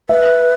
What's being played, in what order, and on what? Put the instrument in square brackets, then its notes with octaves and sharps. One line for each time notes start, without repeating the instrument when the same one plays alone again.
[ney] B4 [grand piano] E5